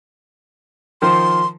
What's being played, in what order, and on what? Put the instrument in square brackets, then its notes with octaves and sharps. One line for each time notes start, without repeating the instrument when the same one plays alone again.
[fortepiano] D#3 F3 C5 [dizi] C6